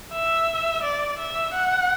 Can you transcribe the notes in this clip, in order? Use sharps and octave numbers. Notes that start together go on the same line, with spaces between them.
E5
D5
E5
F#5